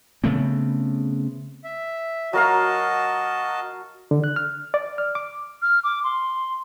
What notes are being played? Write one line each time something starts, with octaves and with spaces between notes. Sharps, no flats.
C#3 A3 B3 C4
E5
F#3 F#4 A#4 D#5 F5 A5
D3
F#6
F6
D5
F6
D6
F6
D6
C6